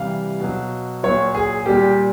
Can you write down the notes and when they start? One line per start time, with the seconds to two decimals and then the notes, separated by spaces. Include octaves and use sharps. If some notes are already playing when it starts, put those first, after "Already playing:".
Already playing: C3 E3 G3 F5
0.40 B2 F#3
1.03 A#2 F#3 C#5
1.35 G#4
1.66 A#2 G3 G4